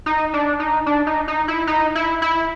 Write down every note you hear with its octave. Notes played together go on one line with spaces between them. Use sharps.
D#4
D4
D#4
D4
D#4
D#4
E4
D#4
E4
E4